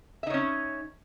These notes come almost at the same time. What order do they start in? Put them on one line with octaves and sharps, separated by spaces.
E5 D#4 C#5 C#4